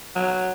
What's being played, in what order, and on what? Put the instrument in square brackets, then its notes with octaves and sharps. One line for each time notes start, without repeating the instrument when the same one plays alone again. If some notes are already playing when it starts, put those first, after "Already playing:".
[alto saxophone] F#3